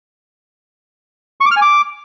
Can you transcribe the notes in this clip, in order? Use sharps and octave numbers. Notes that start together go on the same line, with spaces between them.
C#6
D6
F6
G#5
D6